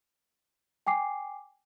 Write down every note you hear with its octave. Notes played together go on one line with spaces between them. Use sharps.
G5 G#5 D6 C7